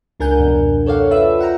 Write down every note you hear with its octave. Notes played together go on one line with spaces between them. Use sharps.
C#2 D4 A#4 F#5 G#5 G6
F2 B2
A4 C#5 D5 F5 F#5
F4 B4 E5 E6
F#5 G5 A#5